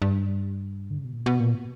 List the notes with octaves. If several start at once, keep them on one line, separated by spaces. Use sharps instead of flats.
G2
D3
C#3
B2
A#2
B2
A#2